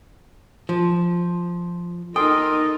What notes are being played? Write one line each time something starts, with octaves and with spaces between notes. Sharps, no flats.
F3
D#4 A4 A#4 D#5 G5 C6 D#6